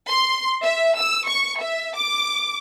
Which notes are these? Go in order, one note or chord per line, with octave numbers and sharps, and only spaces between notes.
C6
E5
E6
C#6
E5
D6